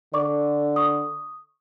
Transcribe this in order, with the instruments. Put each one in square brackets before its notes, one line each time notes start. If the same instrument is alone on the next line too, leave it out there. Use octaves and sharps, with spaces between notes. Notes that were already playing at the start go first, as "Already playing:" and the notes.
[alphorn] D3 [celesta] D5 C#6 D6
[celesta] C#6 D#6